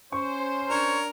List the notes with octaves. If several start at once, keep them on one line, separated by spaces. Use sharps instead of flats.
C#4 C5 C#6
D4 A#4 C#5